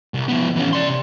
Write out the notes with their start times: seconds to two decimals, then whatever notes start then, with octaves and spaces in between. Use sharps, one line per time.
0.14 C2
0.28 F3 B3
0.56 E3 C#4
0.73 D5 C6
0.89 C3